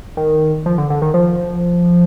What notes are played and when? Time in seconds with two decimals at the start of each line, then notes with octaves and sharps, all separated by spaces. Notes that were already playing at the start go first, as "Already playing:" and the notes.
0.17 D#3
0.66 F3
0.78 D3
0.90 D3
1.02 D#3
1.14 F3